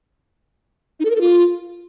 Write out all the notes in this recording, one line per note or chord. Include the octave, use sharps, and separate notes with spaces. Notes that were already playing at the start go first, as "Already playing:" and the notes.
D#4
A4
A#4
A4
F4